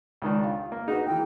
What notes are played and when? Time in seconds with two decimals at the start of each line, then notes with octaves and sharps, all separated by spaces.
0.22 C#2 D#3 D4
0.44 F4
0.72 A#3
0.88 D#4 F#4 G#4 B4
1.06 E3 A#3 G5